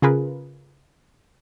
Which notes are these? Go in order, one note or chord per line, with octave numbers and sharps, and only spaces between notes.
C#3 F4 G#4 A#4 B4